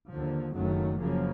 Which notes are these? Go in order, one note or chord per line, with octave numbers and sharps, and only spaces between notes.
D#2 D3 F3
F#1 F#2 D#3 F#3 A3
F#2 C#3 F3 A#3